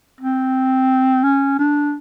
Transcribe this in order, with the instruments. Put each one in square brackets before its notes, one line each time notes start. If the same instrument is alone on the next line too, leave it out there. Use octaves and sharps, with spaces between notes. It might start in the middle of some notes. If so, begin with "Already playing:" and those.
[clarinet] C4
C#4
D4